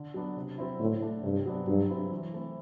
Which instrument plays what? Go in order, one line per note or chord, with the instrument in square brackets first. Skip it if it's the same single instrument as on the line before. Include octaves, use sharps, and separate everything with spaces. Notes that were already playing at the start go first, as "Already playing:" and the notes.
Already playing: [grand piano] D3
F#3 B3 D4
C3
F#3 C4 E4
[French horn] A2 [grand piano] D3
[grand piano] A3 D4
[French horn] G2 [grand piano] C3
[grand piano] F#3 B3 D4
[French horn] G2 [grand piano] F#3
[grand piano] C4 E4
E3
A3 C4 E4